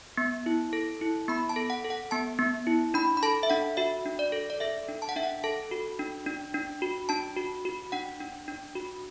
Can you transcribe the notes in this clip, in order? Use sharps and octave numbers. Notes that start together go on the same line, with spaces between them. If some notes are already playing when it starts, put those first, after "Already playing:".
B3
E4
A4
E4
B3 B5
A5
A4
F#5
A4
F#5
B3 A5
B3
E4
D4 B5
B5
A4 A5
E5
D4 F#5
F#4 E5
D4
D5
A4
D5
A4 E5
D4
A5
F#5
D4 E5
F#5
A4 A5
F#4
D4
D4
D4
F#4
D4 A5
F#4
F#4
D4 F#5
D4
D4
F#4